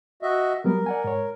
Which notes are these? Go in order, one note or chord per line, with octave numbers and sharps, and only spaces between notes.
F#4 D#5 E5
F#3 G3 B3 A#4
D5 F#5 G#5
G#2 C#5